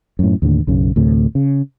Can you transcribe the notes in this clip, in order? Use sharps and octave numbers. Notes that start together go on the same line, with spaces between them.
F#2 A2
D#2 A2 D3
B1 F#2 C#3
D2 A2 C3
C#3